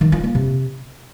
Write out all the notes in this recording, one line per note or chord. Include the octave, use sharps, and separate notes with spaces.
D#3
F4
A#3
C3